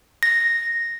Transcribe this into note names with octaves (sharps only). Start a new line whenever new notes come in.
A#6